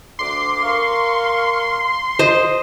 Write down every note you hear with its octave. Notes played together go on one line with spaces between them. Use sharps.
D2 C6 D6
A#4 F5 C#6
C5 D#5